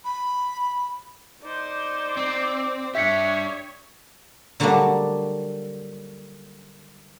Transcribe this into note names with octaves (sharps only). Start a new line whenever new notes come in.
B5
D#4 C5 D5 D6
C4
D4 G4 C#5 E5 B6 C#7
D3 F#3 G3 A#3 D4 F#4